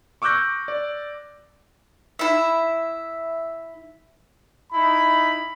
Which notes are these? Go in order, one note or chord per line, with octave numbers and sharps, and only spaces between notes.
C#6 D6 E6 F#6 G6 A#6
D5
E4 E5
D#4 E4 B5